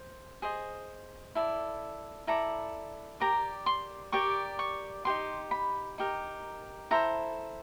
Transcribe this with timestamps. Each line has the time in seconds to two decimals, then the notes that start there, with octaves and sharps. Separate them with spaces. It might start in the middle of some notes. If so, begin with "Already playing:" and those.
Already playing: C5
0.42 G#4 C5 D#5
1.35 E4 A4 D5
2.27 E4 A4 D5 A#5
3.20 G4 A#4 D5 A#5
3.66 C6
4.12 G4 A#4 D5 C#6
4.59 C#6
5.05 D#4 G4 A#4 C6
5.51 B5
5.98 D#4 G4 A#4
6.91 E4 A4 C5 A#5